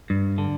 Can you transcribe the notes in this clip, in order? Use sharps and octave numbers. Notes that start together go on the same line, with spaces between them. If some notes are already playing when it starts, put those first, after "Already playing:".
G2
D3